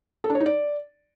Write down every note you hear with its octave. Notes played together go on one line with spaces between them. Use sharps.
A4
D4
C#5
D#4
D5